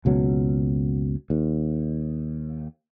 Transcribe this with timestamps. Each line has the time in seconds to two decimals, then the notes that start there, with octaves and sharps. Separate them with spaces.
0.05 F#1 C#2 B2 F#3
1.30 D#2